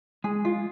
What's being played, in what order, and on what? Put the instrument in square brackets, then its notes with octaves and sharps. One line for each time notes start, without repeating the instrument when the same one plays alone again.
[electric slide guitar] G#3 [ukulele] G#4
[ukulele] F4